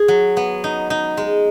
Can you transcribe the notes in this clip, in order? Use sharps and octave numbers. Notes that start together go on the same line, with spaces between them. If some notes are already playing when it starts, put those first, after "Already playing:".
Already playing: G#4
F#3
B3
D#4
D#4
G#3